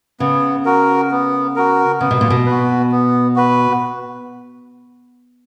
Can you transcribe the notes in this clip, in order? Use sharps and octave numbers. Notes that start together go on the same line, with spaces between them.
C#3 B3
F#4 A#4
B3
F#4 A#4
C#3 B3
B2
A#2
B2
F#4 B4
B3
F#4 B4